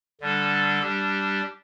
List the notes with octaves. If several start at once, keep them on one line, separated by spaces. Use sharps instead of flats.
D3 G3 D4 A4
G3 D4 G4